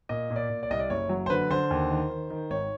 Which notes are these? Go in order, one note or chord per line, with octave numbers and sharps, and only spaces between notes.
A#2 D#5
A#2
D5
A#2
D5
C2 D#5
D5
F#1 C#5
F#3
C5
D3 B4
D3 C5
D#2
D#3
D#3
D#3
G#1 C#5